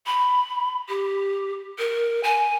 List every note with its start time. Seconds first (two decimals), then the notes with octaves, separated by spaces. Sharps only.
0.06 B5
0.88 G4
1.78 A#4
2.23 G#5